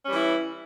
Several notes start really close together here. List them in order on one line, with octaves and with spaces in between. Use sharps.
C#4 G3 E3 E4